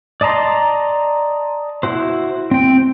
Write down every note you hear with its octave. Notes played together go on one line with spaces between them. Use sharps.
D5 D#5 A5 A#5 C6
E4 F#4 C5
C4 G5